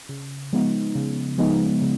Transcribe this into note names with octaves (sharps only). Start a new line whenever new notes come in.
C#3
F3 G#3 B3 D#4
C#3
F3 G#3 B3 D#4
C#3